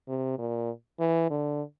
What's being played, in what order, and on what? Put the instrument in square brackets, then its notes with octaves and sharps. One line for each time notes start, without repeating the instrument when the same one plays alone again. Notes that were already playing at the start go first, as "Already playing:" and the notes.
[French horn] C3
A#2
E3
D3